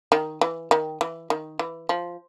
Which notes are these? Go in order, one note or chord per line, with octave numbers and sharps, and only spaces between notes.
D#3
E3
D#3
E3
D#3
E3
F3